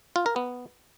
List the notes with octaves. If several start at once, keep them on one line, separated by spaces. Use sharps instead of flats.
F4
A#4
B3